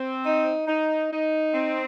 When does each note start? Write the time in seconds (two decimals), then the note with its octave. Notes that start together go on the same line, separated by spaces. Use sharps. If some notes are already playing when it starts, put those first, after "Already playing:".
Already playing: C4
0.25 D#4
0.68 D#4
1.11 D#4
1.54 C4